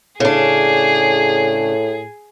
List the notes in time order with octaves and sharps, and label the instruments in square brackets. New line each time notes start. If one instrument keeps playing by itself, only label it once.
[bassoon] A2 [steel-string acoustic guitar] C#3 D4 [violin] G#4